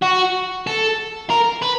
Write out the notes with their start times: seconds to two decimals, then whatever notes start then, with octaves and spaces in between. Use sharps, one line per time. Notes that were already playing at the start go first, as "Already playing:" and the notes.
0.03 F#4
0.67 A4
1.30 A#4
1.62 B4